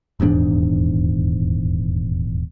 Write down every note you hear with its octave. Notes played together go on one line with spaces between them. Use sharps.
D#1 E2 G#2 D4